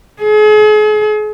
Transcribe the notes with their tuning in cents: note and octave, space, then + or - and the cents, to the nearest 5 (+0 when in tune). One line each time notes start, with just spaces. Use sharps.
G#4 +40